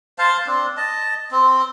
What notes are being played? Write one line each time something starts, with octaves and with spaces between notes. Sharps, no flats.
C5 F5 A5
C4 D4
D#5 A5
C4